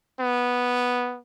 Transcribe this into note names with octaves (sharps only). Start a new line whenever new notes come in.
B3